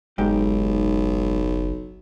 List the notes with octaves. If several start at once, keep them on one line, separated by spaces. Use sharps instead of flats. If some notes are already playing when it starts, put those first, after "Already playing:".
F#1 B1 G#2 G4